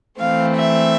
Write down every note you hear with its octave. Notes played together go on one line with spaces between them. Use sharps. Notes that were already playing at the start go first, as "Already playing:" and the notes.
E3 A3 C4 F5
E5